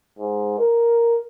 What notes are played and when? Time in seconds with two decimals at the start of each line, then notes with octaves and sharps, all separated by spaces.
0.19 G#2
0.59 A#4